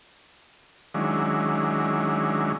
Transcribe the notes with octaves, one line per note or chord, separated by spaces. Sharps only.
D#3 F#3 G#3 C#4 D4 E4